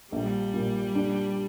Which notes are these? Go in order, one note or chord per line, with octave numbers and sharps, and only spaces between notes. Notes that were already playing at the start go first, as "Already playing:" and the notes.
A#1 G3
A#2
D4